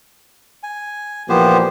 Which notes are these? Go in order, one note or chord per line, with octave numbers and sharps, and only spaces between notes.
G#5
A#2 E3 F3 B3 G4 C5